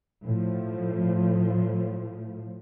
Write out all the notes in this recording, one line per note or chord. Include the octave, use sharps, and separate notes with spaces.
A2 F3